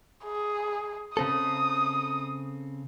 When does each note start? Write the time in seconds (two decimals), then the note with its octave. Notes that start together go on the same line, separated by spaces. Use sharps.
0.25 G#4
1.17 C#3 C4 A4 D#6